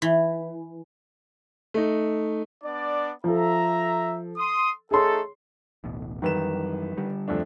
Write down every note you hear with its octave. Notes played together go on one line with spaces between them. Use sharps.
E3
A3 D#4
B3 D4 D5
F3 A4 E5 A#5
C6 D#6
A3 D#4 G#4 A4 C#5 C6
D1 A1 B2
F#2 D#3 E3 G3 B4 E7
D3 G3
F2 A3 D4